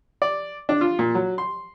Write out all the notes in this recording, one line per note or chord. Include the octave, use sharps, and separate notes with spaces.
D5
D4
F4
A#2
F#3
C6